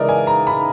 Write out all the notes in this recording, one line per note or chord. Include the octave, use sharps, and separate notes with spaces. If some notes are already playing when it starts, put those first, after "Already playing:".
Already playing: C#3 E3 G#3 A#4 D5 D#5
G#5
A#5
B5